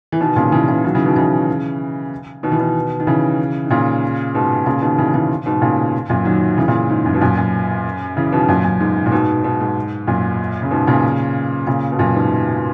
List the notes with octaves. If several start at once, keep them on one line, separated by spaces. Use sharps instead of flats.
E3
B2 D#3
A#2 C#3
C#3 E3
C#3 E3
D#3 F#3
C#3 E3
B2 D#3
C#3 E3
B2 D#3
E3
B2 D#3
D#3
C#3 E3
D#3
A#2 C#3
G#2 B2
A#2 C#3
B2 D#3
C#3 E3
C#3 E3
G#2 B2
A#2 C#3
F#2 A#2
D#3 F#3
C#3 E3
A#2 C#3
G#2
F#2
B2
F#2 A#2
F#2
C#3 E3
B2 D#3
F#2 A#2
F#2
G#2
A#2
G#2 B2
G#2 B2
G#2
F#2 A#2
C#3
G#2 B2
A#2 C#3
A#2 C#3
B2
F#2 A#2
G#2 B2